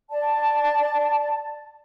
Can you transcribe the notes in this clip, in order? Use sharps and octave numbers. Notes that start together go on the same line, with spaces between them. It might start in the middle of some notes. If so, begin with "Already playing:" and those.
D5 A5